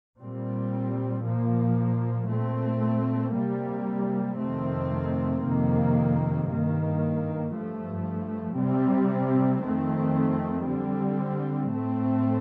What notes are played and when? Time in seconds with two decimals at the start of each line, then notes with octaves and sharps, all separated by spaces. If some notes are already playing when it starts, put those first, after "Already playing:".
0.21 A#2 G3 C4
1.25 A#2 F3 A#3
2.30 A#2 A3 C4
3.34 C3 G3 A#3
4.39 F2 C3 D#3 A3 C4
5.44 F2 C3 D#3 A#3
6.49 G2 D#3 A#3
7.54 G2 F3 A3
8.58 C3 G3 C4
9.62 F2 D#3 A3 C4
10.68 D3 G3 C4
11.73 A2 A3 C4